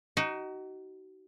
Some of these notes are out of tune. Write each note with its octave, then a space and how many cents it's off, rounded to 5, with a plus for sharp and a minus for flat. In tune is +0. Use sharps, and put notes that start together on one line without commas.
D#4 +0 F#4 +35